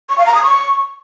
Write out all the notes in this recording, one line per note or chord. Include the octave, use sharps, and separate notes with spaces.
C#6
F5
A#5
D#6
C#6